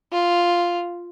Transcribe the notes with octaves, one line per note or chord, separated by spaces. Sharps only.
F4